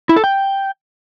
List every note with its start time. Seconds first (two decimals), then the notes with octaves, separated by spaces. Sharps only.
0.09 E4
0.16 A4
0.24 G5